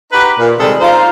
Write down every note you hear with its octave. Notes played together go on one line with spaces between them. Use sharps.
D#4 F#4 G4 B4
A#2
C3 D#3 G3 G#3 G#4 A4
D#4 F4 C5